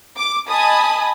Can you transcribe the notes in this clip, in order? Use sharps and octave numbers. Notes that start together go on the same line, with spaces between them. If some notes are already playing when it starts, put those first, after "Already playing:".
D6
D#5 G#5 A5 B5 D#6